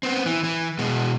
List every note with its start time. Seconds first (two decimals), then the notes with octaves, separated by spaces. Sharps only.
0.03 B3 C4
0.26 E3
0.44 E3
0.79 B2 G#3